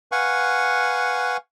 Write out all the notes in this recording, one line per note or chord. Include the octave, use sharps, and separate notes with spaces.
B4 F5 F#5 G#5 C#6